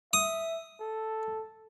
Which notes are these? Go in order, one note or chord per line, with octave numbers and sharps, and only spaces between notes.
E5 D#6
A4